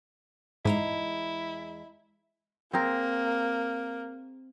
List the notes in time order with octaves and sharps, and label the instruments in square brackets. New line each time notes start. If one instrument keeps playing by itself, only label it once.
[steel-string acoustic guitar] E2 G#3 A#5 [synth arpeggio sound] G#2 [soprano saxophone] E4
[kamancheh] A#3 [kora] C4 G#4 A#4